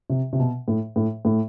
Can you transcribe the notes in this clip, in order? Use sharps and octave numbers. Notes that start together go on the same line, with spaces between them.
C3
C3
B2
A2
A2
A2